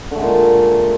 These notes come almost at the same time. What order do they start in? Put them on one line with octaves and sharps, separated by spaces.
D3 A3 G#3 A#2